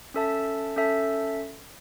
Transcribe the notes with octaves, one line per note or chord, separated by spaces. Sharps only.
C#4 A4 E5 A5
C#4 A4 E5 A5